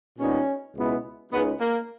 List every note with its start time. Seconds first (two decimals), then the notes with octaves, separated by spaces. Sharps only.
0.19 A#2 G3 B3 C#4 D#4
0.75 C#2 B2 G#3 B3 E4
1.32 C#2 C#3 G#3 B3 D#4
1.60 A#3